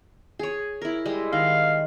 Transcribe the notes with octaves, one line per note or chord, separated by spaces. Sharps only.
G#4 C#5
E4 A#4
G3 G#3
D#3 F5